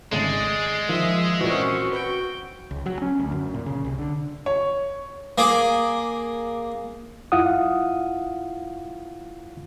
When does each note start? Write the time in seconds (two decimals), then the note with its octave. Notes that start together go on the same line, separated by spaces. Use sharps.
0.12 G#1 C#3 G#3 A3 D5
0.89 D#3 F3 E5 D#6
1.41 A#2 E3 C4 C#4 F#4
1.93 B4 G5
2.71 C#2
2.86 F#3
3.02 C#4
3.19 D2
3.32 F#2
3.54 A#2
3.66 C#3
3.84 C2
3.98 D3
4.46 C#5
5.38 A#3 G#4 D6
7.32 F#2 E4 F4 F5 F#5 D#6